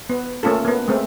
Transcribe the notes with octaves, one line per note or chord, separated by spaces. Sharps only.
B3
A3 A#3 C#4 F4 A4
A#3 B3
G#3 A3 C4